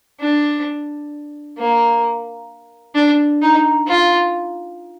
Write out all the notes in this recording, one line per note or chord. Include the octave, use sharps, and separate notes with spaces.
D4
A#3
D4
D#4
F4